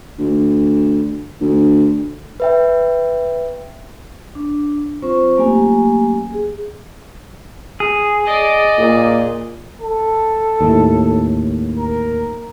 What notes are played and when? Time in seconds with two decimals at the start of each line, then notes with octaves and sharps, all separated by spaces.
0.19 D2
1.41 D2
2.40 B4 E5 G5
4.35 D4
5.02 F#3 C4 F4 C5 C#6
5.37 F#3 A3 A#3 C#4 G4 G#5
6.33 G#4
7.80 G#4
8.26 D5 D#5
8.78 A#2
9.81 A4
10.61 D#2 A2
11.78 A#4